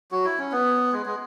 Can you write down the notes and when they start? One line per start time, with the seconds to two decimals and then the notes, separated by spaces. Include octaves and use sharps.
0.12 F#3 F#4
0.25 E4
0.39 C#4
0.52 B3
0.93 G#3
1.06 G#3